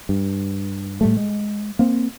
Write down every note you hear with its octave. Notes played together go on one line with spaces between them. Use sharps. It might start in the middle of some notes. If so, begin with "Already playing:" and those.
G2
A2 G3 A3
G#3
A#3 C4